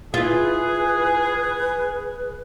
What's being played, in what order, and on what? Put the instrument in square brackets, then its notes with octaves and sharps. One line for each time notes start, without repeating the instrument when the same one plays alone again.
[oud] E4 F4 [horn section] G#4 [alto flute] B4